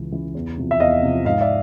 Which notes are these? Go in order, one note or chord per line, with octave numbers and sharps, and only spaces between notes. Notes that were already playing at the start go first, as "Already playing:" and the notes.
Already playing: C#2 C#3 E3
C#3 E3
E2
C3 F3
E5
E2 D#5 F5
C3 F3
G#2 D#5 F5
D5 E5